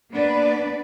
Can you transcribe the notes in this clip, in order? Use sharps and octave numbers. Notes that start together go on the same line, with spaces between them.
A#3 B3 D4 B4 D5